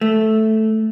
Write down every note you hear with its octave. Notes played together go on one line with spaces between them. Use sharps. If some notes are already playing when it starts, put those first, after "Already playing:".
A3